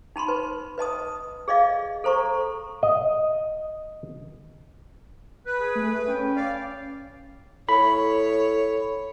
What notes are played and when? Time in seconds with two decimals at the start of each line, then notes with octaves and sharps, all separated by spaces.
0.16 D#4 A5 B5 C6
0.28 B4
0.78 B4 D#5 A5 D#6
1.48 G#4 D5 D#5 F5
2.04 A4 C5 A#5 C#6
2.83 D#5
5.46 B4 F#6
5.59 G#4
5.75 A3
6.08 C#4 G5
6.36 D5 F5
7.69 A2 C#5 B5